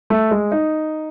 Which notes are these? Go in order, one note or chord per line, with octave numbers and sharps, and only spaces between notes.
A3
G#3
D#4